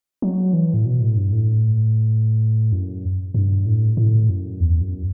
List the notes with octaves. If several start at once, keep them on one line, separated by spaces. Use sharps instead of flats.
F#3
E3
A2
B2
A2
G2
A2
F#2
G2
A2
A2
F#2
E2
F#2